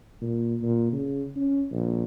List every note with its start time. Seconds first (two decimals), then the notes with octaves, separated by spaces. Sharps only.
0.21 A#2
0.61 A#2
0.92 C#3
1.36 C#4
1.71 A#1